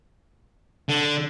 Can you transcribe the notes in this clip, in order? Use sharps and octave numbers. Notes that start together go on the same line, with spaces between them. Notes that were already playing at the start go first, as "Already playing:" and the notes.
D3